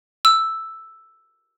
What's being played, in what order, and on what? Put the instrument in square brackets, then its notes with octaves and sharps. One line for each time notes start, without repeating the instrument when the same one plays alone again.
[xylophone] E6